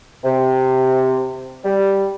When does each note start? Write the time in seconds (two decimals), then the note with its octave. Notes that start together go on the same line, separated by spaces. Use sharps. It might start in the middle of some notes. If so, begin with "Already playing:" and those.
0.24 C3
1.65 G3